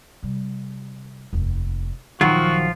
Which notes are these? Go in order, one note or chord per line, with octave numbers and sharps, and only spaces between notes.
C3 G3
F1 D#2
A#1 D#3 F3 F#3 F4 F#4